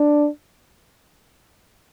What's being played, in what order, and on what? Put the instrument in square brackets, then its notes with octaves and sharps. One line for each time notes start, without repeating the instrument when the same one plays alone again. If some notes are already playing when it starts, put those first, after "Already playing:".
Already playing: [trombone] D4